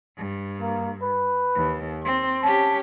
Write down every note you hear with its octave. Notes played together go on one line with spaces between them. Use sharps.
G2
A#3
B4
D#2
C4 C6
C#4 G4 A5